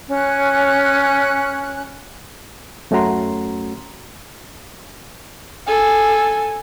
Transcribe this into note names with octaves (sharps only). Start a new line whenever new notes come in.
C#4 F#6
F#2 A3 C#4 F#4 A#5 C6
A4 G#5